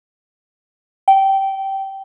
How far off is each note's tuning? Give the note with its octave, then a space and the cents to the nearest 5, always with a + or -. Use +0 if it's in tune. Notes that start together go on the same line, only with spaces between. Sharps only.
G5 -15